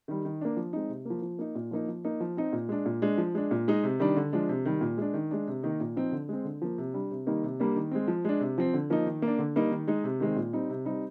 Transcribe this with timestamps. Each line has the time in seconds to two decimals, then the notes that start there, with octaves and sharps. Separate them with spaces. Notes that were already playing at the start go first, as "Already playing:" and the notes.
0.08 D#3 G3
0.25 D#3
0.41 A#3 D4
0.57 F3
0.73 G#3 C4 D#4
0.89 C3
1.05 F3 A#3
1.22 F3
1.39 A#3 D#4
1.55 A#2
1.71 F3 A#3 D#4
1.88 F3
2.05 A#3 D#4
2.20 F3
2.37 C4 D#4
2.53 A#2
2.69 G#3 D4
2.86 A#2
3.02 G#3 D4
3.18 F3
3.35 G#3 D4
3.51 A#2
3.68 G#3 D#4
3.84 C3
4.00 D#3 G3 D4
4.16 D3
4.33 F3 G#3 D4
4.49 C3
4.65 D#3 G3
4.81 A#2
4.98 G#3 D4
5.14 D#3
5.31 G#3 D4
5.47 C3
5.63 D#3 A#3 D#4
5.80 A#2
5.96 F3 C4 D#4
6.12 D3
6.29 G#3 C4
6.45 D3
6.62 F3 A#3
6.78 C3
6.94 G3 D4
7.11 C3
7.27 D#3 G3 A#3 D#4
7.43 C3
7.60 G3 A#3 D4
7.76 D#3
7.91 G#3 C4
8.08 F3
8.25 G#3 D4
8.40 C3
8.58 F3 C4
8.73 D3
8.90 F3 A#3 D#4
9.06 D#3
9.22 A#3 D4
9.38 D3
9.56 G3 A#3 D#4
9.71 D#3
9.88 G#3 D#4
10.04 C3
10.20 D#3 G#3 C4
10.36 A#2
10.53 G3 C4 D#4
10.70 C3
10.85 G3 C4 D#4